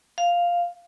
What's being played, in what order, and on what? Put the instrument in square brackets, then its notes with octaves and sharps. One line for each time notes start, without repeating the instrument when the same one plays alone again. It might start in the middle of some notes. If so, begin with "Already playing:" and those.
[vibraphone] F5